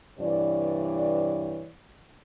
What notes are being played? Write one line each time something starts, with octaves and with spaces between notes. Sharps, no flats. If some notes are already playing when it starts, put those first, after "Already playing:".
G2 C3 E3 C#5 D5